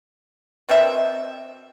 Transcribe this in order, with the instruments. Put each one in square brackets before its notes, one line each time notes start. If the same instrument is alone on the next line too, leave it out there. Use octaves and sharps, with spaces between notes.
[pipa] B2 C4 A#4 E5